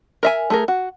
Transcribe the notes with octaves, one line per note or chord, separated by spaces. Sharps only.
A#4 E5 G#5
A3 G#4 A#4
F#4